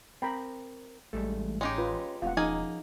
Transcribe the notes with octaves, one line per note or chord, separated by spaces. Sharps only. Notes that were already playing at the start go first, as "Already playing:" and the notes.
C4 A#4 G5 A#5 B5
A1 G#2 G3 A3
G#3 C#4 D#4 G4 C#5
F4 B4
E1 A2 C3 F4 F5 F#5
F3 A#3 C#4 D#4 G#4 G#5